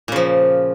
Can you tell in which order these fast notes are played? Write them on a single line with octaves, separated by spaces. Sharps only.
A#2 C#3 F3